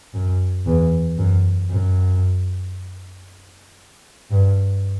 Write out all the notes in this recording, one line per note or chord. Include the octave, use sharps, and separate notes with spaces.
F#2
E2
F#2
F#2
G2